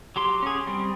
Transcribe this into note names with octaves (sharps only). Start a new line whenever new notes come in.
F#3 G4 C6
C#4 G#4
G3 C4